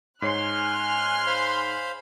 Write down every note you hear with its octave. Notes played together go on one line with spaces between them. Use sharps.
G#2 C#5 G#5 C6 F6 F#6 C7
C5 F5 B5